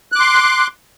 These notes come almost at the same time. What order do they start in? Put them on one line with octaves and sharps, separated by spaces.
F#6 D6 C6